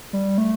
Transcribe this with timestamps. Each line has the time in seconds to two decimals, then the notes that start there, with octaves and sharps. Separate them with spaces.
0.13 G3
0.38 A3